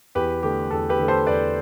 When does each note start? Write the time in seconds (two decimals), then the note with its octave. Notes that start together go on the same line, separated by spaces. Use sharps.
0.15 E2 G4 B4
0.43 D3 A3 G4
0.71 E2 A4
0.89 G4 B4
0.99 D3 A3
1.08 A4 C5
1.27 E2 B4 D5